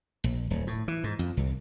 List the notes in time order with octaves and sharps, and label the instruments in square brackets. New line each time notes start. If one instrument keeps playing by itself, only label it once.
[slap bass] A#1
D1
A2
E3
G#2
F2
C2